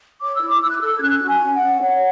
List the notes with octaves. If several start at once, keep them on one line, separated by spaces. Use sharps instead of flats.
C#5 D6
E6
E4
D6
E4 E6
F#6
A4 E6
G#6
C#4 F#6
F#4
G#5
C#4
F#5
C#4
C#5 F#5